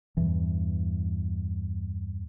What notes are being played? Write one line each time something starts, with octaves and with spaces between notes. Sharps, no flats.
E2 G2 E3